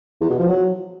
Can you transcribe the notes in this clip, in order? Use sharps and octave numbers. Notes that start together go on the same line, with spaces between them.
E2
B2
F3
F#3